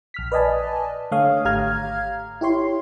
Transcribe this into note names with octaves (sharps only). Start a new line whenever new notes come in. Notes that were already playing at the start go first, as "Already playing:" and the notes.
A#1 F6 B6
B4 D5 D#5 G#5 A5
D3 A3 C#5 F5 D#6
G#1 G4 F5 A#5 F6 G#6
E4 G4 C#5 C6